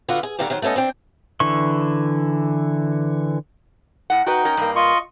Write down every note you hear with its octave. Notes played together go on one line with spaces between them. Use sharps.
D3 B3 F4 F#4
G#4
D3 D#3 G3 A#3 G4
D#3 F#3 C5
A3 B3 C#4 A4 D#5
C4 D4 G5
D3 E3 C#6
A2 F#5
D#4 F#4 B4 G5
C#4 A#4
G2 A#3
F4 D#5 C#6